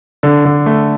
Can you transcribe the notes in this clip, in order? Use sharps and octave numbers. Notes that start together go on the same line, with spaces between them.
D3
D3
A3